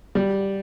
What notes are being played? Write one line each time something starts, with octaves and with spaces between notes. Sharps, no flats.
G3